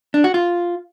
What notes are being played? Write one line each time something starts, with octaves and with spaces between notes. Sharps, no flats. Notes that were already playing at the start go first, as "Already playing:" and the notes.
D4
F#4
F4